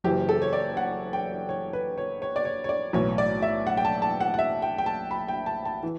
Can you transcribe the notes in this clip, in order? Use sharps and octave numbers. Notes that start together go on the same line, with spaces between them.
F#1 F#2 E3 G4
A4
C#5
D5
F#5
G5
C#5
B4
C#5
C#5
D5
C#5
C#5
D5
B1 A2 E3 C#5
D5
E5
F#5
G5
A5
A5
F#5
F#5
E5
G5
G5
A5
B5
G5
A5
A5
E3